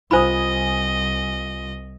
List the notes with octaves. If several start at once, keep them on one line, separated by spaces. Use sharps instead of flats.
C2 F4 C5 D#5 G#5 B5 D#6